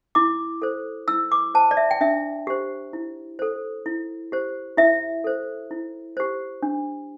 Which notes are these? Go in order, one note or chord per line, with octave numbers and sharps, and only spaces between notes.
E4 D6
A4 C5
E4 E6
D6
C5 A5
D5
E5
G5
D4 E5
G4 C5
E4
A4 C5
E4
G4 C5
E4 E5
A4 C5
E4
G4 C5
D4